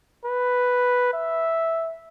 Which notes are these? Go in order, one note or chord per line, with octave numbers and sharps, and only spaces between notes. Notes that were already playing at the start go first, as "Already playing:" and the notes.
B4
E5